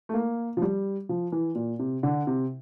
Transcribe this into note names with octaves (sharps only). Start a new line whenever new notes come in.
A3
A#3
F3
G3
F3
E3
A#2
C3
D3
C3